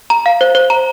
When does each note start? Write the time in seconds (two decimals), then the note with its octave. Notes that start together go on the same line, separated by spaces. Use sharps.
0.10 A#5
0.26 F5
0.41 C5
0.55 C5
0.70 A#5